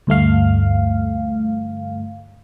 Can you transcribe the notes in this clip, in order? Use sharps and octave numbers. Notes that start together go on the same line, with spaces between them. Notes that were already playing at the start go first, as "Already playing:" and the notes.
D2 G2 A3 F5